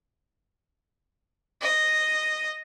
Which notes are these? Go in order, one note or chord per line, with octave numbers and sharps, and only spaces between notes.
D#5